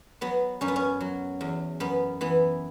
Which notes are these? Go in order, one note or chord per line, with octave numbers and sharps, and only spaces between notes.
F#3 B3
F#2 C#4
B3
C#4
F#3
E2
F#2 B3
E3 B3